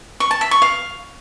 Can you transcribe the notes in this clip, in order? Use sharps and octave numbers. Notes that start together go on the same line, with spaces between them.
C#6
A5
E5
C#6
F5